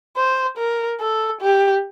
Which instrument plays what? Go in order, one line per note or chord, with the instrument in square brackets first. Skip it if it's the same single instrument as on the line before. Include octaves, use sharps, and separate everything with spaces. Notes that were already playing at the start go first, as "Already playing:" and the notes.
[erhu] C5
A#4
A4
G4